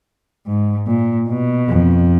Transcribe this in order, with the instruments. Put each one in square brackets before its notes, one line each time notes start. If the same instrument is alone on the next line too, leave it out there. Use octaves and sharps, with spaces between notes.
[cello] G#2
A#2
B2
[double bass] F2